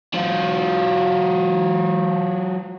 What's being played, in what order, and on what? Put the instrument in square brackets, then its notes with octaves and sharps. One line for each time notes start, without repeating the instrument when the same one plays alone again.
[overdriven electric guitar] F#3 F4